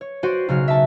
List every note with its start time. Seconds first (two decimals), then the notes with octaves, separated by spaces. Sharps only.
0.01 C#5
0.23 F#4 C5 D5 F#5 G5 D#7
0.48 B1 C#3 F#4 F6
0.68 E5 A5